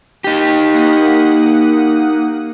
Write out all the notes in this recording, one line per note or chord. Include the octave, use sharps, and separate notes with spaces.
D#4 G4
A#3 F#5 D#6